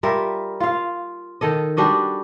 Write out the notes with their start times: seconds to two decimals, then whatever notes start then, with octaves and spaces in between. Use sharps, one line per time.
0.03 G3 F4 A#4 E5
0.60 F4 F5
1.41 D#3 A4 D#5
1.77 G3 D4 F#4 D#5